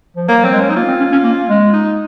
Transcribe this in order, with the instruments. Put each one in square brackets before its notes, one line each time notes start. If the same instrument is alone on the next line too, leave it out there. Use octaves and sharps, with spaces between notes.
[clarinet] F3
[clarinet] F#3 [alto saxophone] A#3
[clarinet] F#3 [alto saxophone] C4
[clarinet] G#3
[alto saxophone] C#4
D#4
[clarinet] A#3 [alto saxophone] F4
[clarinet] C4
C#4
C#4
A#3
G#3
[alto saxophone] D#4